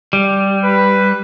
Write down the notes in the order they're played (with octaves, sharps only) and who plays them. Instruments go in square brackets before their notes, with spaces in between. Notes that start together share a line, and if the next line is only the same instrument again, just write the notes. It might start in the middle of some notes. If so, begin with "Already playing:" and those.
[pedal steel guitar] G3
[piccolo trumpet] B4